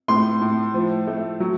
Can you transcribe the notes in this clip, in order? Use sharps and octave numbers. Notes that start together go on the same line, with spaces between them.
A2 C6
A2
F3
A3
F#3